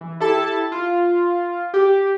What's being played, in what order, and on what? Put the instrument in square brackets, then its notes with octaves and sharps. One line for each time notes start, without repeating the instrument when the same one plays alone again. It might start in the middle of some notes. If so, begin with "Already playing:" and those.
[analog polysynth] E3
E4 G4 A4 A5
F4
G4